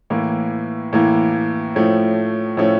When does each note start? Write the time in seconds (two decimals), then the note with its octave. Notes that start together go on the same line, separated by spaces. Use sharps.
0.10 A2 E3 A#3
0.93 A2 E3 A#3
1.75 A2 F3 A3 C#4
2.57 A2 F3 A3 C#4